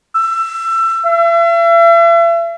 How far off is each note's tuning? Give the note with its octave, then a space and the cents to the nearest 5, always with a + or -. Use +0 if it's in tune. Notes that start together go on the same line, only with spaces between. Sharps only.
E6 +25
E5 +40